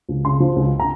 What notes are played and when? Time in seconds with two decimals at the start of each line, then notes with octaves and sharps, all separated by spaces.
0.09 C#2
0.25 C#3 C6
0.40 F3
0.56 C#2
0.80 A#5